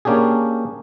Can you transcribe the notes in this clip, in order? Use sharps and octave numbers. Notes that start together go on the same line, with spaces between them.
A#3 C#4 D4 G4 G#4